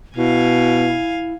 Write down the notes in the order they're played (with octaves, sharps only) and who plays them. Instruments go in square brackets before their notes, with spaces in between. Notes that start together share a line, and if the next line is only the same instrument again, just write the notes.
[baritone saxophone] B2 [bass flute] E4 [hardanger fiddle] F5 G#5